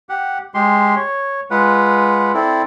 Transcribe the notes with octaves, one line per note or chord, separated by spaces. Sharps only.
G4 F#5
G#3 G4 C6
C#5
G#3 F4 B4 F#5
C4 E4 A4 D5